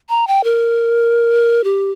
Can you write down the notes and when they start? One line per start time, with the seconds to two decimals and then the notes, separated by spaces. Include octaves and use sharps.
0.09 A#5
0.27 G5
0.44 A#4
1.64 G4